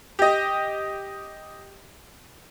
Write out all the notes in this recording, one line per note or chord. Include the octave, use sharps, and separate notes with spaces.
G4 D#5